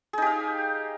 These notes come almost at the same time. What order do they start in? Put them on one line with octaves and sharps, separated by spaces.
G#4 D#4 G4 F5